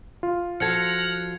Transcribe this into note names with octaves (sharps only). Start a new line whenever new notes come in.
F4
F3 F#4 A4 F6 F#6 G#6 A#6 C#7